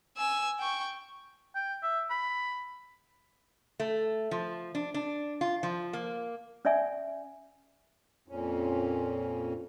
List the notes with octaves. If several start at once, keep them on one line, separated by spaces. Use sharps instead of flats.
G#5 E6
G5 C#6
G5
E5
B5
A3
F3
D4
D4
F4
F3
A#3
C#4 D5 E5 G#5
F2 A#2 C#4